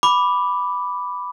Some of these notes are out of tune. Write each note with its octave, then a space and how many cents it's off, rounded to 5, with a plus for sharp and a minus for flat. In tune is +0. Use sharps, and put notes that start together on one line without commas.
B5 +0 D6 +0